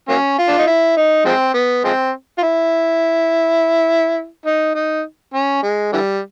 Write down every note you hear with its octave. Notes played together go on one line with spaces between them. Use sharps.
F#3 A#3 C#4
F4
D4
D#4
E4
D#4
F3 G#3 C4
B3
F3 G#3 C4
F4
E4
D#4
D#4
C#4
G#3
D3 E3 G3